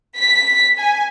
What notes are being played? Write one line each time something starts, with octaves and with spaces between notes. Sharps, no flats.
B6
G#5